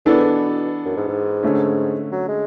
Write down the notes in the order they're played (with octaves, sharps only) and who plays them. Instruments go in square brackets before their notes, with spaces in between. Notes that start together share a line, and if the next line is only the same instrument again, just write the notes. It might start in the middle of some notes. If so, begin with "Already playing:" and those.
[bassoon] F#2 [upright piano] E3 B3 D4 A4
[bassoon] G#2
B2
F#2
G#2
G#2
[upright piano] D3 A3 C#4
[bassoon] F#3
G#3